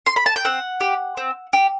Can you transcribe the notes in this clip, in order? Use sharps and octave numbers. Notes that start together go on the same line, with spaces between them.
C6
B5
A5
G5
C4 F#5
G4
C4
G4